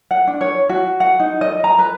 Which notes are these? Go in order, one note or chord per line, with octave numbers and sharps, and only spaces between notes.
F#5
D4
C#5
F#4
F#5
D#4
D#5
A#5
B4